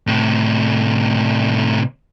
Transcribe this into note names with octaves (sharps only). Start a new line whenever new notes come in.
A2 C3